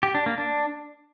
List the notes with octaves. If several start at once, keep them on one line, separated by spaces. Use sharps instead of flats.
G4
D4
A#3
D4